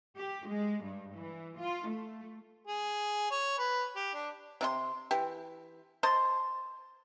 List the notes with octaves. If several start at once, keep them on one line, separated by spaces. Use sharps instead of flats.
G4
G#3
G2
E3
F4
A3
G#4
C#5
B4
G4
D4
C3 D#4 C6
E3 G4
C5 D#5 A5 C6